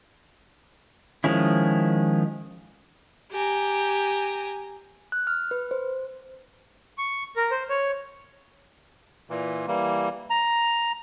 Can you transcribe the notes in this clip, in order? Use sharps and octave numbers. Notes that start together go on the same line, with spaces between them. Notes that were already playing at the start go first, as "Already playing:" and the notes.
D#3 F3 G#3 C#4 E4
G4 G#5 A#5
F#6
F6
B4
C5
C#6
A#4
C5
C#5
A#2 E3
E3 G3 A#3
A#5